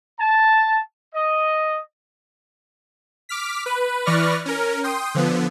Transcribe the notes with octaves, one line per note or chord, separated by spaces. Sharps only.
A5
D#5
D6 F6 B6
B4
E3 B4 D5 C#6 F6 A#6
C#4 A#4
G5 C6 D#6
D3 F3 B3